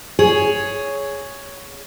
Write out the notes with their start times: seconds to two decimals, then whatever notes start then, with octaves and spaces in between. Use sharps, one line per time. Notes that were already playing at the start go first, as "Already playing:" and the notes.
0.19 G#4 C#5